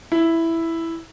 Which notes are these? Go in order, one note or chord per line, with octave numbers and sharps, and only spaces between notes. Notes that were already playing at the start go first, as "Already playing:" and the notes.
E4